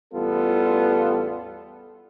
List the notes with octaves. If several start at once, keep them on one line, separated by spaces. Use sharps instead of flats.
A1 E2 G3 B3 F4 A4